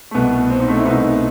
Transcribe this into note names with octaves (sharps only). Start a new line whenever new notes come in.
A3
C2 B2 B3
C4
D#4
A3 C4
E4
C2 B2 B3 D#4